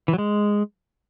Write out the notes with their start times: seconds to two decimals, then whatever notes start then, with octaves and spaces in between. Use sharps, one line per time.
0.08 E3
0.13 F#3
0.18 G#3